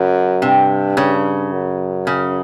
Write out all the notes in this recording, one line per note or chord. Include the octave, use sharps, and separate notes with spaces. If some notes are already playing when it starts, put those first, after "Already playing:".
Already playing: F#2 C#3
G2 C3
C#3
F#2
C#3